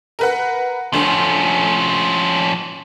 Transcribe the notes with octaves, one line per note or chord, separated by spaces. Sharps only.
A#4 B4 F#5
D2 F3 C#4